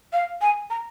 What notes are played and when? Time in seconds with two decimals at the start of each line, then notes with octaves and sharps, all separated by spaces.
0.13 F5
0.42 G#5
0.70 A#5